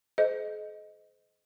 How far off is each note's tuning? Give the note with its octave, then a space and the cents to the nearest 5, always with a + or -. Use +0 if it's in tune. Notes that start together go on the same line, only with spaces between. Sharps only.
G#4 +45 C5 -25 D#5 +0